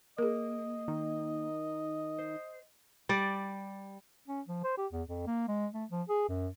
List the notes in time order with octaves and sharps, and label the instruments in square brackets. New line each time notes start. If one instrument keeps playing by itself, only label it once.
[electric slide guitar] A#3 [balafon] G#4 A#4 [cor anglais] D#5
[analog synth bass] D#3
[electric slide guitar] C5
[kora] G3 D5
[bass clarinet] C#4
F3
C5
G4
E2
F2
A#3
G#3
A3
F3
G#4
F#2